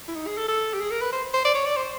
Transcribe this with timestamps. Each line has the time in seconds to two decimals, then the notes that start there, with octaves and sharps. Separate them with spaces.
0.08 E4
0.16 D#4
0.27 G#4
0.37 A4
0.48 A4
0.74 G4
0.80 G#4
0.91 A#4
1.01 B4
1.12 C5
1.34 C5
1.45 D5
1.55 C#5
1.66 D5
1.77 C5